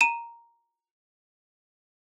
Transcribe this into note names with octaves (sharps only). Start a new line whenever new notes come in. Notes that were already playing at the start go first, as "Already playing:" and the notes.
A#5 D#7 E7